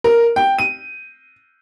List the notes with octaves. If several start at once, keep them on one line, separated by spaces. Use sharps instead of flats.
A#4
G5
D#7